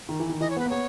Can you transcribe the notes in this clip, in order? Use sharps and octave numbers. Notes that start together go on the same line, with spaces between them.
D#3
E3
D#3
E3 D#5
C#5
B3 B4
A#3
B3 C#5